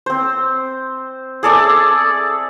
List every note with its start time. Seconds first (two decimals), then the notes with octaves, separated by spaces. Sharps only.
0.06 C4 C5
1.43 G#4 A4 D5 E5